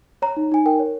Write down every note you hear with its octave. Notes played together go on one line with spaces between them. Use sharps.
C#5 A#5
D#4
D#4 G#5
A#4 G5
C#5